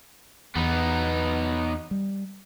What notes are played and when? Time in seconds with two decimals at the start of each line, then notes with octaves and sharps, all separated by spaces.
0.56 E2 B3 D#4
1.91 G3